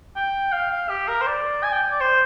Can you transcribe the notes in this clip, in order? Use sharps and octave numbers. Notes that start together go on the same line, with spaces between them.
G5
F5
F5
G4
A#4
C5
D5
G#5
G5
D5
C5